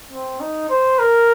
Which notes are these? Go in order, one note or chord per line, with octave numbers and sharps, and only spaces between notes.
C4
D#4
C5
A#4